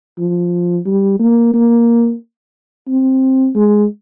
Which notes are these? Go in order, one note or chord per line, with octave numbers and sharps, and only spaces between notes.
F3
G3
A#3
A#3
C4
G#3